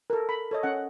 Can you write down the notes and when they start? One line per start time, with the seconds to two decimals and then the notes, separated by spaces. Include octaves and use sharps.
0.10 A4 A#4
0.29 B5
0.51 A4 C#5 D#5
0.63 C#4 F#5